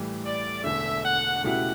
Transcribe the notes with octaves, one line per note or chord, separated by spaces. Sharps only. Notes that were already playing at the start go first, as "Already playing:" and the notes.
Already playing: A2 E3 G3
D5
E1 E2 D3 A3 E5
F#5
C#2 B2 A3 E4 G4 F#5